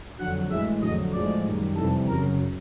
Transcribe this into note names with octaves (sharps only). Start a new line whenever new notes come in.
F2 D3 F#3 F#5
A2 E3 G#3 E5
F2 D3 F#3 D#5
A2 F3 G#3 D5
F#2 D#3 G3
F2 C3 E3 G3 A4
F#2 C#3 F#3 A#4